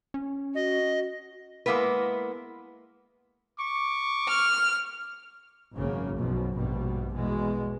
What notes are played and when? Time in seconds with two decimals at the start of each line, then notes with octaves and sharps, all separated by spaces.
0.14 C#4
0.55 F#4 D#5
1.66 G#3 A#3 B3 E4 B4
3.59 C#6 D6
4.28 F6
5.75 G#1 F#2 C#3 A#3
6.18 B1 F#2 B2 F3
6.54 A#1 G2 B2 G3
7.13 E2 B2 G#3